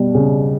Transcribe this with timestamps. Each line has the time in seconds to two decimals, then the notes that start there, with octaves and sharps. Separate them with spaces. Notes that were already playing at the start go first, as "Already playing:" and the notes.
Already playing: B2 G3
0.15 C#3